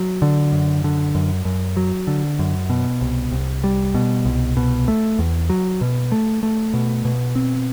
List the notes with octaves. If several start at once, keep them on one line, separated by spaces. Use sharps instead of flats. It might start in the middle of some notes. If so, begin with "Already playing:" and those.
Already playing: F#3
D3
F#2
D3
F#2
F#2
F#3
D3
F#2
B2
C2
C2
G3
B2
C2
B2
A3
E2
F#3
B2
A3
A3
B2
B2
C4